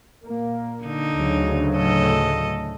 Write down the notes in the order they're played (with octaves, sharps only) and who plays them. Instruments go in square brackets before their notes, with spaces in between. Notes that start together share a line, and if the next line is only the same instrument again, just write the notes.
[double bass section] A#2 A#3
[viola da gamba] D3 D#4
[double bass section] D2 C#3 F#3
[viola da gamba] A2 A4 D#5